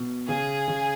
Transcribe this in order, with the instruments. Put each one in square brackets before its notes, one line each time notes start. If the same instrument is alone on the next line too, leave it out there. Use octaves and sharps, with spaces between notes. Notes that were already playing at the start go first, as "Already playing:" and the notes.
Already playing: [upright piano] B2
[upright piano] C#3 [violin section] G#4
[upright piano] C#3